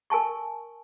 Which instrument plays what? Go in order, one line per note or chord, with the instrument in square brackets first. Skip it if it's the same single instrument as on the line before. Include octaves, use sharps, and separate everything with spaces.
[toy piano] A#4 G#5 A5 C#6